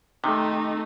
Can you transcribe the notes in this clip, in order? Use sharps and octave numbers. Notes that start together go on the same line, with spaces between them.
C3 D#3 A3 D#4